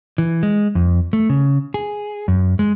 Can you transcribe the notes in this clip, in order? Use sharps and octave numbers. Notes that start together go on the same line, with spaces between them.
E3
G#3
F2
A3
C#3
G#4
F#2
G#3